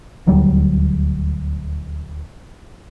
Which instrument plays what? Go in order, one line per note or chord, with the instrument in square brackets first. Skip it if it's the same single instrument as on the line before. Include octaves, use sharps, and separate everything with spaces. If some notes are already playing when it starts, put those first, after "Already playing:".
[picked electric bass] D#1 D2 F#3 G3